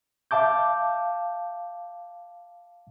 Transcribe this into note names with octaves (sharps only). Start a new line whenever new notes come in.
E5 F5 A5 D6 G6